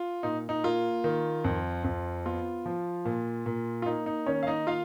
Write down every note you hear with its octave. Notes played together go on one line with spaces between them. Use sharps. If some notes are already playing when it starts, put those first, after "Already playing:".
Already playing: F4
A#2 D#4
D#4
A#3 F4
D#3
F2
F2
B3 F4
F3
A#2
A#2
F4
A#3 D#4
D#4
D#3 C#4 C#5
F5
D#4 D#5
F4 F5